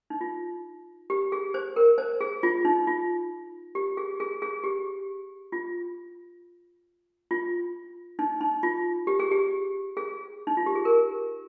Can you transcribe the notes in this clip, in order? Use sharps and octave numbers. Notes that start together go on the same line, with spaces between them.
D#4
F4
G4
G#4
C5
A#4
C5
G#4
F4
D#4
F4
G4
G#4
G#4
G#4
G4
F4
F4
D#4
D#4
F4
G4
G#4
G4
G#4
D#4
F4
G4
G#4
A#4